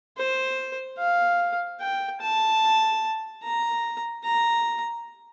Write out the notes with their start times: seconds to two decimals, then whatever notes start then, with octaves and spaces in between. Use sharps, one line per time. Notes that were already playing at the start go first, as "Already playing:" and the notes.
0.17 C5
0.98 F5
1.81 G5
2.21 A5
3.43 A#5
4.24 A#5